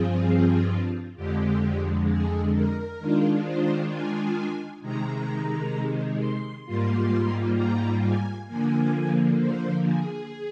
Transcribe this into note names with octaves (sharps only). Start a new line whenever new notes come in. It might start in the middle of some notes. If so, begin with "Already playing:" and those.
Already playing: G2 F3 C4 F4 G#4
F2 D3 G#3 G4
G#4
A#4
D#3 G#3 D4 F4
C5
G#5
C3 D#3 G#3 A#5
C6
G#2 G3 A#3 F4 C6
A#5
G#5
D3 F3 A#3 G#5
C5
G#4